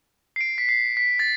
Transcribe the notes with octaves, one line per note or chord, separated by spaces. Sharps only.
C7
D7
B6
C7
B6
A6